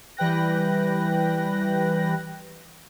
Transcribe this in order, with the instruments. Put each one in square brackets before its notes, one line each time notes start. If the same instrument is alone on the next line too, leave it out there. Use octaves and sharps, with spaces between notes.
[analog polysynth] E3 G3 B4 G5 F#6 A#6